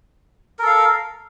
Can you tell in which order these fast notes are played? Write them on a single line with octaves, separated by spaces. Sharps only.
A#4 A4 F5